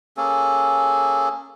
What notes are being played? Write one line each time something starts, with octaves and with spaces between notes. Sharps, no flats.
A#3 C#4 G#4 A4